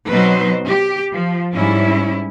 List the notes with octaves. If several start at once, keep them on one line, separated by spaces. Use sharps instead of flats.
B2 F#3 C4 D#4 B4 C5
G4
F3
G#2 G3 C#4 E4